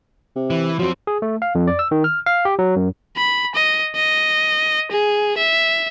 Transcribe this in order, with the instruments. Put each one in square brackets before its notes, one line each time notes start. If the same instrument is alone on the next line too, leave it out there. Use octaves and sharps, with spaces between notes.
[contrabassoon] C3
[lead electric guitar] E3
[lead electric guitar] F3 C4 [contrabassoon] F#3
[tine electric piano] G#4
A3
F5
F2
D5
E6
D#3
F6
F5
G4
F#3
F#2
[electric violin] B5
D#5
D#5
G#4
E5